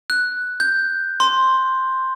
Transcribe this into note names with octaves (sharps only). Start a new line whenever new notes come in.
F#6
G6
C6